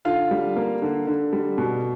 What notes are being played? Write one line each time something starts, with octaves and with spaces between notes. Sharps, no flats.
D3 F4 F5
G3
A#3
D3
D3
G3
B2